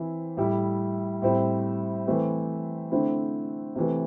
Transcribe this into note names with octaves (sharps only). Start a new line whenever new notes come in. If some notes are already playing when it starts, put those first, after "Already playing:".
Already playing: E3 C4 E4
A2 G3 E4
A2 G3 C4 E4
E3 A3 C4
D3 A3 C4 E4
C3 E3 A3